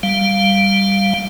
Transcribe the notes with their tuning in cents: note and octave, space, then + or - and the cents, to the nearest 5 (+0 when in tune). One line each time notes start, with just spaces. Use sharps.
G3 +0 F5 +0